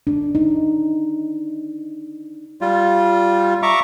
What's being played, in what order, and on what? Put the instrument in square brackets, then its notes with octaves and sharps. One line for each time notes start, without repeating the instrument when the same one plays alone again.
[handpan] D4
D#4
[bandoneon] G3 F4
E5 A#5 C#6 D6